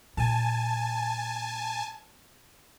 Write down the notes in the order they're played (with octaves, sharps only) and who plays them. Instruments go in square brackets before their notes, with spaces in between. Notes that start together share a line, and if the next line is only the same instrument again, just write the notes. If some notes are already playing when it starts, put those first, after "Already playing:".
[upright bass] A#2 [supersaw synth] G#5 A5